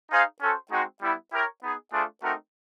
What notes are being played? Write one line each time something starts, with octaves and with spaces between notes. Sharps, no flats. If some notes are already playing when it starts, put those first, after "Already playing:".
D#4 G#4 C5 F5
C#4 F#4 A4 C5
G#3 C4 D#4 F#4
G3 B3 E4
E4 G4 A#4 C#5
B3 D#4 G#4
A3 D4 F4 G#4 C5
A3 C4 D#4 F#4 A#4